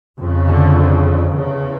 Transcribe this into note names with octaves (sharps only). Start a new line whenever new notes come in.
F2 C#3
D3
E2 C#3